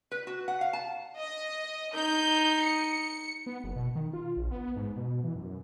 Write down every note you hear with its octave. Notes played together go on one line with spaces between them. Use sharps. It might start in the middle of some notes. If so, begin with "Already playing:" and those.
B4
F#4
F#5
F5
A5
D#5
D#4 G6
C#7
B3
F#1
B2
D#3
F4
A#1
B3
G#2
B2
E3
F#2